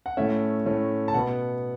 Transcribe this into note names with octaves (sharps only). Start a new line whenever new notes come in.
F#5
A2 A3 C#4 E5
A2 A3 C#4
A5
B2 B3 F#5